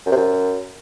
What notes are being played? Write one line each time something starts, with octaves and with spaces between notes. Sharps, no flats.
F#2
C3
F#2